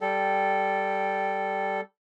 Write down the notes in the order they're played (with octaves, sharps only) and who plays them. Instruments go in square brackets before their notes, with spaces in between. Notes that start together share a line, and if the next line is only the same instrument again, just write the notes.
[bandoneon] G3 A4 [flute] G5